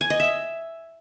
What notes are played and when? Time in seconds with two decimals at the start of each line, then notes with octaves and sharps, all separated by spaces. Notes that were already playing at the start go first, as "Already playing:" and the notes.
0.01 G#5
0.10 D#5
0.20 E5